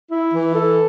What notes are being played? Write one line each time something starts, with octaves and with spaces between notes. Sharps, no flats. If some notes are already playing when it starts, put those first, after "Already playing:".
E4
E3
A4